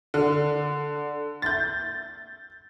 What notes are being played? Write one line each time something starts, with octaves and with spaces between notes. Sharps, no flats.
D3
G6 A6